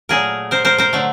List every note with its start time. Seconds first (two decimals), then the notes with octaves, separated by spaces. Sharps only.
0.09 A#2 F#3 A3 G#4 A#4
0.51 A#4 C5
0.65 A#4 C5
0.78 A#4 C5
0.93 D3 F#3 A3